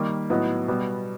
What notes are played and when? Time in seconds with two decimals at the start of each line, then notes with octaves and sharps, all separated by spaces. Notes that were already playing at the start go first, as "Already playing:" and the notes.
Already playing: D#3 G3 A#3
0.30 A2 F#3 B3 D#4
0.68 B2 G3 B3